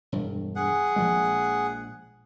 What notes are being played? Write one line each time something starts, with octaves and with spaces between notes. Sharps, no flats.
E1 G2
G#4 F#5
A#1 F3 G#3